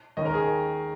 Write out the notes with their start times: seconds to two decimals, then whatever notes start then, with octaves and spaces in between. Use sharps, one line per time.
0.17 D#2 D#3 C#4 D#5
0.25 A#4
0.34 G#4